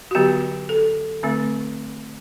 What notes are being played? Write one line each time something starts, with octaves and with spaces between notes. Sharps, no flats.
F#4
D3 F#3 B3 G4
A4
D3 A3 C4